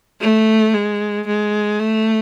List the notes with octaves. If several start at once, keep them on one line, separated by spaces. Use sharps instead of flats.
A3
G#3
G#3
A3